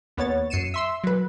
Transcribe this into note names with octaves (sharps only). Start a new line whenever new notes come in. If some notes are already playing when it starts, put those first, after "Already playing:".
D#2 B3 C#5 A6
F#2 C7 C#7 D#7 E7
E5 C6 E6
F#3 B4